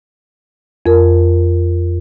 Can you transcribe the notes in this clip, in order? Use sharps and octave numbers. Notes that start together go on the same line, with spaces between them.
F2 A#4